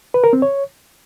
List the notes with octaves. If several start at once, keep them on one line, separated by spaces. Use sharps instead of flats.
B4
A#4
C4
C#5